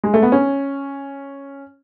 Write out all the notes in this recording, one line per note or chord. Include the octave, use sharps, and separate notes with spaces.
G#3
A3
B3
C#4